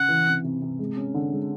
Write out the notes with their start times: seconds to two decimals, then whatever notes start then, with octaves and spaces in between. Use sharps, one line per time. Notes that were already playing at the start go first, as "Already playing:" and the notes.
Already playing: C#3 F#5
0.09 E3
0.27 C3
0.44 C3
0.62 C3
0.79 G#3
0.97 C#4
1.14 D3
1.32 G#3